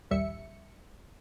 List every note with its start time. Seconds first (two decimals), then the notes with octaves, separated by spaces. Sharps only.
0.11 A#1 D#2 G3 E5 C#7